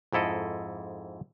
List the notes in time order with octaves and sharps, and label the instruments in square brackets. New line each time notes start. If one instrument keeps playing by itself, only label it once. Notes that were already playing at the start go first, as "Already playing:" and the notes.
[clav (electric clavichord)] F2 G#2 E4 A4 D#5